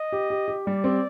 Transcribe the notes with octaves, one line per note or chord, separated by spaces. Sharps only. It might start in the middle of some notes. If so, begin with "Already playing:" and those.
Already playing: D#5
G4
G4
G4
G3 D5
C4